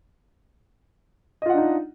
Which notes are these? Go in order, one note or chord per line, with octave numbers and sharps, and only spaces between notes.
D4 D#4 F4 D#5 F#5